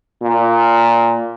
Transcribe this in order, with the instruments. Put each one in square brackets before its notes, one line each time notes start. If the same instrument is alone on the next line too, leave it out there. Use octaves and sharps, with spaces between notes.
[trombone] A#2